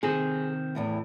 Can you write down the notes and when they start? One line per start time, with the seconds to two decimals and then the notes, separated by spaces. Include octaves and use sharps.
0.03 C3 D#3 C4 G#4
0.75 E2 A2 E3